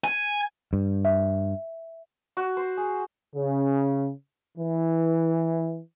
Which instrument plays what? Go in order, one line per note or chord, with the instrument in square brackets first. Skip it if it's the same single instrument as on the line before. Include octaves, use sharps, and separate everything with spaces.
[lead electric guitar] G#5
[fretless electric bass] G2
[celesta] E5
[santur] F#4
C5
G#4
[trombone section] C#3
E3